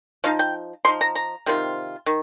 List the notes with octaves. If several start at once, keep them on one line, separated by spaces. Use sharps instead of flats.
F3 D#4 F5
G5
F3 D#4 C6
A#5
A#5
C3 D#3 C4 F4
D#3